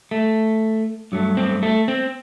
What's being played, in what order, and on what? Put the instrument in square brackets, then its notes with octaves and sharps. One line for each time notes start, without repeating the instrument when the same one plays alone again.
[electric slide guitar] A3
G2 F#3 A3
C4
A3
C4